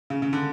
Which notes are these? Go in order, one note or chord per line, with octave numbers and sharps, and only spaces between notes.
C#3
C#3
D3